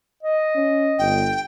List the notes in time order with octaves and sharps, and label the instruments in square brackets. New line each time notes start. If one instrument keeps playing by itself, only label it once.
[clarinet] D#5
[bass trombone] C#4
[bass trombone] G1 [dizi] G5